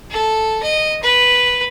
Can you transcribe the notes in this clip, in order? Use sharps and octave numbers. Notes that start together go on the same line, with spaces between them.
A4
D#5
B4